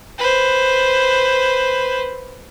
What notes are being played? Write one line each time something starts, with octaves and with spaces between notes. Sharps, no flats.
B4 C5